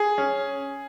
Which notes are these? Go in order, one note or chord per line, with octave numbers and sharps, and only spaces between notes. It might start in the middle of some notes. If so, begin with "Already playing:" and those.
Already playing: G#4
C#4